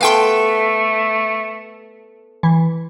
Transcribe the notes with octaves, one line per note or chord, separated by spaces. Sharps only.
A3 B3 A4 F5 G5 C6
E3